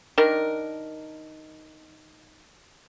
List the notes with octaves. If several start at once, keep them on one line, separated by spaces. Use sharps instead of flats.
D#3 D4 A#4